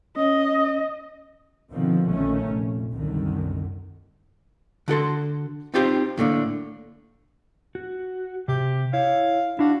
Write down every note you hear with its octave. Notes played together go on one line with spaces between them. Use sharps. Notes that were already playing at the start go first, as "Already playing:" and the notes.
C#4 D#5
B2 D3 D#3 F3 C4
A#1 D#3 A3 C#4
F1 A#1
C2 F#2 D3 D#3
D3 F#4 A4 C6
C4 D#4 F4 G4 C5
D#2 A2 D3 A#3
F#4
C3 G4
E4 C#5 F5
D4 E4 F#4 F5